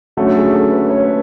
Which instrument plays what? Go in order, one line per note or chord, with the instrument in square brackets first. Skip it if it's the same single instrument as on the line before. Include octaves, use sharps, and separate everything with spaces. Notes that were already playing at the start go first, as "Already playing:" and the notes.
[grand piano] D3 F#3 A3 C#4 [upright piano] F#4
[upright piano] G#4
A4
B4
C#5
B4